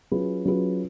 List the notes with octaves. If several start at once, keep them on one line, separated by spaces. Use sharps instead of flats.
F#3 C#4 F4 G#4 B4
F#3 C#4 F4 G#4 B4